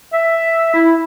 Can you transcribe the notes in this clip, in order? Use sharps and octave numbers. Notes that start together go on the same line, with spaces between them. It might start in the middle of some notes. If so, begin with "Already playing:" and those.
E5
E4